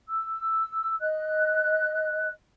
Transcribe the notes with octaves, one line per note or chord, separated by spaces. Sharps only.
E6
D#5 F#6